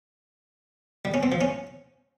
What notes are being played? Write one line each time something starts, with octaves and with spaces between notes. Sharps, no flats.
G3
C#4
C4
F3
C#4